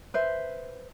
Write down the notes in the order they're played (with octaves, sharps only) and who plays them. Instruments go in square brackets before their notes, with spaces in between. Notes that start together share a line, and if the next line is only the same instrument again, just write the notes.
[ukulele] B4 C5 E5